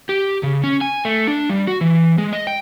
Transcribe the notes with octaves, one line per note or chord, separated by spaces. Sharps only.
G4
C#3
C#4
G#5
A3
D4
G3
F#4
E3
G#3
D#5
G5